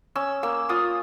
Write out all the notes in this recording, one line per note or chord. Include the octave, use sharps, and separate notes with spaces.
C#4 E6
A#3 E6
F4 D#6